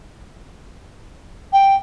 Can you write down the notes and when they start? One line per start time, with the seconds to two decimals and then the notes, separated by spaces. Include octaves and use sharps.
1.53 G5